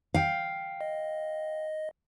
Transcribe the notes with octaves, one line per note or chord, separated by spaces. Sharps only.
F5 G5
D#5